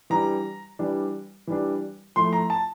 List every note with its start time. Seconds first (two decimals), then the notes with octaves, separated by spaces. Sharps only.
0.10 E3 G3 D4 A#5
0.79 E3 G3 D4
1.47 E3 G3 D4
2.16 F3 A3 E4 C6
2.33 A#5
2.50 A5